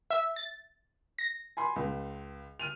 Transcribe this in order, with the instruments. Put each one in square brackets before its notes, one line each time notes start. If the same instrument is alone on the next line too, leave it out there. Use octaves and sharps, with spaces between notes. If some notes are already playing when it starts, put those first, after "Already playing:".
[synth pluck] E5
A6
A#6
[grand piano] G#5 B5 C6
C#2
F6 D#7 F7